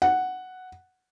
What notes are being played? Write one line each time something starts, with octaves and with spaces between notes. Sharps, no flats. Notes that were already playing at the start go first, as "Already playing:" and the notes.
F#5